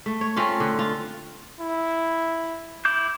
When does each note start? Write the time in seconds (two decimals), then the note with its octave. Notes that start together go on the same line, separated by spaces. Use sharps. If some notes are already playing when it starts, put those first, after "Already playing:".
0.06 A3
0.21 C#5
0.36 A3 C4 C#4 F4
0.60 D3
0.79 F4
1.60 E4
2.85 E4 D6 G6